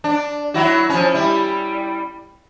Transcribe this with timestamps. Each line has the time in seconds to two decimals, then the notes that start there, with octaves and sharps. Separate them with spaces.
0.04 D4
0.54 F#3 E4 F#4
0.89 F3 C#4
1.14 G3 E4